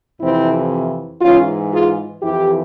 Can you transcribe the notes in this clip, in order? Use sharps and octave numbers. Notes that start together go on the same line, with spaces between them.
F2 C3 E3 C4 E4
G#2 E3 C#4 F4
F4 G#4
F2 E3 E4 G4